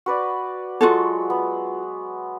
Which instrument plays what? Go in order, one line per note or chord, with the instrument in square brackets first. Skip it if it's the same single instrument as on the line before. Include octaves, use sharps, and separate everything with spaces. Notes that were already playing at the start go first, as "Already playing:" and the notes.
[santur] F#4 B4 D5
[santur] F#3 G#3 [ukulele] F4 F#4 A4
[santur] B3